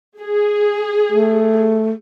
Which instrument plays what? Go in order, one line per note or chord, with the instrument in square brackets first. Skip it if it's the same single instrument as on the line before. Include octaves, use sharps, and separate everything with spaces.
[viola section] G#4
[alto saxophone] A3